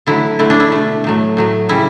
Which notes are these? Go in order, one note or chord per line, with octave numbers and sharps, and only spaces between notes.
D3 F#3 A3 E4
D3 A3 E4
D4
E4
B2 A3
A2 F#3 A3
A2 F#3 A3
C#3 G3 E4